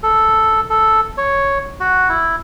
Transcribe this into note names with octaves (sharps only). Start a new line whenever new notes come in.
A4
A4
C#5
F#4
E4